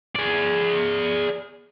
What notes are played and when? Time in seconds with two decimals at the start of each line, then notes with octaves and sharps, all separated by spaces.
0.16 G#4 D5